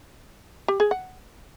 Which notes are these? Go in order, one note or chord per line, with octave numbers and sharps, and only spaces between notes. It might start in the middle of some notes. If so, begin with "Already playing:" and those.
G4
G#4
F#5